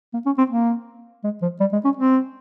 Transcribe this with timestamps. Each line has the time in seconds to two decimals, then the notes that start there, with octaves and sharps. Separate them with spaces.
0.14 A#3
0.26 C#4
0.38 C4
0.50 A#3
1.24 G#3
1.42 F3
1.60 G3
1.73 G#3
1.85 C#4
1.97 C4